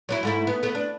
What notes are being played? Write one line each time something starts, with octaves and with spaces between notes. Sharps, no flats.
F#3 C4 E4
G#2 A3 E4
B3
A3 B3
D4